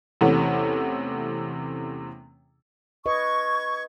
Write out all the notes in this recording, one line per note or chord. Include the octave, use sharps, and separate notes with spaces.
E2 C3 E3 A3 B3 C#4
B4 D#5 C#6 G#6